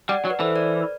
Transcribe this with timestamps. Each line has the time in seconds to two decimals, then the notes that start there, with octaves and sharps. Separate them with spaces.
0.09 G3 D5 F#5
0.25 F#3
0.30 B4
0.40 E3 A4 C5
0.56 B4 D5